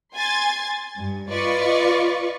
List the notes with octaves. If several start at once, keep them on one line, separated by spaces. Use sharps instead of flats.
G#5 C6 G#6 A6
G2
F4 B4 D5 D#5 C#6